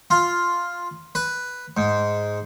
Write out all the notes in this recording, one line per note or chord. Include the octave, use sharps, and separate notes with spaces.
F4
B4
G#2